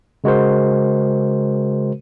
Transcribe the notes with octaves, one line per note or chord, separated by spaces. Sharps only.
C#3 G#3 F#4 A#4 C5